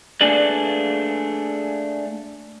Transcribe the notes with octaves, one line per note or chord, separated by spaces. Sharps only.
A3 A#3 D4 G#4 B4 D5